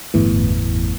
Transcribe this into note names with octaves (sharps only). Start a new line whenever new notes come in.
G1 E2 A2 E3